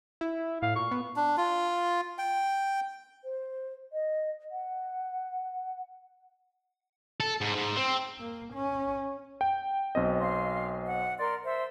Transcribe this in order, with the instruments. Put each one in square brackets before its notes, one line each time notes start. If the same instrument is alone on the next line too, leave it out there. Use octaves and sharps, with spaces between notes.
[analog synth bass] E4
[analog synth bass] A2 [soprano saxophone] F5
[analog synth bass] A#2 [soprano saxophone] C#6
[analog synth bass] B3
[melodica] D4
F4
G5
[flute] C5
D#5
F#5
[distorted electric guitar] A4
G#2
G#2
C4
[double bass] A#3
C#4
[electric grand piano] G5
B1 C4 D#5
[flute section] F5 C6
F#5
A#4 D5 C6
C5 E5